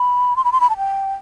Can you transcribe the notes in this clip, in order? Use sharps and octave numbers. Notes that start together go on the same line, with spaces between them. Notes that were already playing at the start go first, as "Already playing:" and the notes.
Already playing: B5
C6
B5
C6
B5
A5
G5